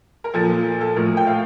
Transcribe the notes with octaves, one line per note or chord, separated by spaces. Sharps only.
A#4
A#2 F3 A4
F4
A4
A2 F3 A#4
G5
F5